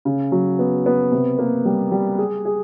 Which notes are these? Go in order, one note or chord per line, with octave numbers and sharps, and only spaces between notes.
C#3
F#3
B3
B3
C3
A#3
G3
G3
G#4
G#4